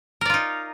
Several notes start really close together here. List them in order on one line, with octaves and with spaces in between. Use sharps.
A#4 D5 F4 D#4